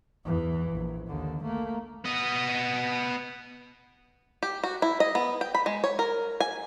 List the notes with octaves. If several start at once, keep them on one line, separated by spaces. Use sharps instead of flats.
E2 E3
A#1
D#2 D3
A3 A#3
B3 D#5
G4
F#4
E4
D#5
B3
G5
B5
G#3
C#5
A#4
G#5